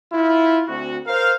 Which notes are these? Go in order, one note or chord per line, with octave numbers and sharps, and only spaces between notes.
E4 F4
D2 C4 F#4
A#4 C5 F5